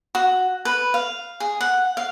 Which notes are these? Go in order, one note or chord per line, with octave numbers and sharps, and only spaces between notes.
F#4
B4
F5
G#4
F#5
F5